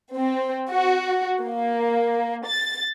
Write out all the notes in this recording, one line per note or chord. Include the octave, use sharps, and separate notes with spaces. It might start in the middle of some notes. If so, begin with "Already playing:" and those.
C4
F#4
A#3
A6